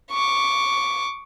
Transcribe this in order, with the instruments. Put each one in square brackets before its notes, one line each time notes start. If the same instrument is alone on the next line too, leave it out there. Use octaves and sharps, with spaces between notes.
[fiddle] C#6 D6